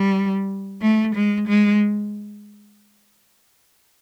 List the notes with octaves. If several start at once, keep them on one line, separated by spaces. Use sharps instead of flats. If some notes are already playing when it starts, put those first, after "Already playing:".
Already playing: G3
A3
G#3
G#3